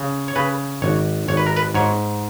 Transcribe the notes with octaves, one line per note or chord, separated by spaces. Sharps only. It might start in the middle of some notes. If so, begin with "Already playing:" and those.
Already playing: C#3
C#5
C#3 B4
G#1 C#5
G#1 C#5
B4
A#4
B4
G#2 C#5